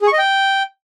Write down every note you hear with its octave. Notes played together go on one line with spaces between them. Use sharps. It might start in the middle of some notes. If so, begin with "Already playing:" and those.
G#4
C#6
D#5
G5